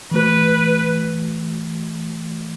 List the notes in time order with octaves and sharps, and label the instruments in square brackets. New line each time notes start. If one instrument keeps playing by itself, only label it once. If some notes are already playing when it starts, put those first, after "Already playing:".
[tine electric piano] E3 A3 F#4 [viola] B4